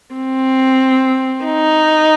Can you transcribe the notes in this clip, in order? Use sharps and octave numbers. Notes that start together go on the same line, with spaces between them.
C4
D#4